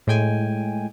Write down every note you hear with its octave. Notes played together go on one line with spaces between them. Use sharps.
A2 G#3 G5 G#5